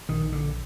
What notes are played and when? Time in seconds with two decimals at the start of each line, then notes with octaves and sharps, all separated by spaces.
0.09 A#1 D#3
0.32 D3